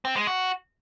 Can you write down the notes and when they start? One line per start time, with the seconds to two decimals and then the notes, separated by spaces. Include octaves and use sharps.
0.05 C4
0.16 G#3
0.27 F#4